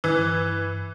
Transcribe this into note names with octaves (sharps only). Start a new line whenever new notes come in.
G2 E3